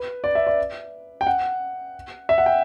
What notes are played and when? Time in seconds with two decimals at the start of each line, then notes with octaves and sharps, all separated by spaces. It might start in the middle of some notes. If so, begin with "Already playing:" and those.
Already playing: B4
0.24 D5
0.35 E5
0.47 D5
1.21 G5
1.27 F#5
2.29 E5
2.38 F#5
2.46 G5